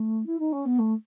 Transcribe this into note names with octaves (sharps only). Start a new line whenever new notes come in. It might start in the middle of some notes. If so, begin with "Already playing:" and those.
Already playing: A3
E4
D#4
C#4
B3
A3